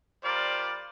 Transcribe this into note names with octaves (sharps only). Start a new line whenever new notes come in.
G3 F4 A#4 C5 D5